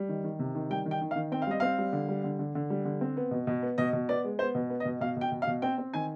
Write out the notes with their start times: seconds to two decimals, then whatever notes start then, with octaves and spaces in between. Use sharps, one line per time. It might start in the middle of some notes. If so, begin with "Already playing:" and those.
Already playing: G3
0.09 D#3
0.24 D#3
0.39 C3
0.55 D#3
0.70 G3 G5
0.86 D#3
0.91 G5
1.01 D#3
1.11 F5
1.16 D#3
1.32 C4 G5
1.42 F5
1.47 G3 D#5
1.60 C4 F5
1.78 G3
1.93 D3
2.09 G3
2.24 D3
2.39 D3
2.55 D3
2.70 G3
2.85 D3
3.01 C4
3.17 B3
3.31 B2
3.47 B2
3.62 B3
3.78 B2 D#5
3.93 B2
4.09 B3 D5
4.24 G#3
4.39 B3 C5
4.55 B2
4.70 B3
4.80 D#5
4.85 B2
5.01 B2 F5
5.17 B2 G5
5.32 B2
5.42 F5
5.47 B2
5.62 C4 G5
5.78 C4
5.94 D#3 G#5